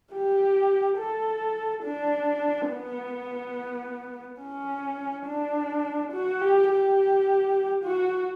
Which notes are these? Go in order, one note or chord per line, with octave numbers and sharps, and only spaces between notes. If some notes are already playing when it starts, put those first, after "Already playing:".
G4
A4
D4
B3
C#4
D4
F#4
G4
G4
F#4